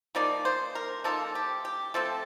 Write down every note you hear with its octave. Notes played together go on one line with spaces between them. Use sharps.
F3 A#3 D#4 D5
C5
A#4
F3 A#3 D#4 A4
G4
G4
F3 A3 C4 A4